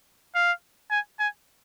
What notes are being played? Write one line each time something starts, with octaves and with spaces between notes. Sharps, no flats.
F5
G#5
G#5